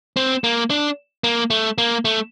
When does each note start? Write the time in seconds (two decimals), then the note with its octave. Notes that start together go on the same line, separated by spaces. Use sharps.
0.17 C4
0.44 A#3
0.70 D4
1.24 A#3
1.50 A3
1.78 A#3
2.05 A3